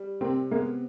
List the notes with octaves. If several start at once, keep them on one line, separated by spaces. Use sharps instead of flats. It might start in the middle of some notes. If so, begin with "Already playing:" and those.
Already playing: G3
C3 A#3 C4
G#3 A#3 B3